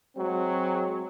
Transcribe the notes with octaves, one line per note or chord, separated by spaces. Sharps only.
F#3 G#3 C4 F#4